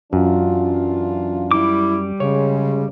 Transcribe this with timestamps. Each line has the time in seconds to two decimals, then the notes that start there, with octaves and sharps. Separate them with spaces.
0.13 F#2 E3 D4 F4
1.51 G3 E4 D6
2.20 F#2 C#3 G#3 C#4 C#5